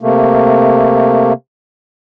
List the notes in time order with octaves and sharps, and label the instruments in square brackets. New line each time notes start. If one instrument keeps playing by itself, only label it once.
[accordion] C3 A3 A#3